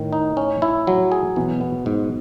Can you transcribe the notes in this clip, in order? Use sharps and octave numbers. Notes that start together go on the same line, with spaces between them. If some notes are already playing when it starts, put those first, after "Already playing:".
Already playing: A2 D#3
D#4
C#4
E4
F#3
G#4
B2 E3
B3
G#2